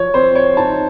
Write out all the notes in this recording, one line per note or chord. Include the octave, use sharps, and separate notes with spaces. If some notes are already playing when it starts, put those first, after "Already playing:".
Already playing: F3 C#5
C4 C5
C#5
D#4 A5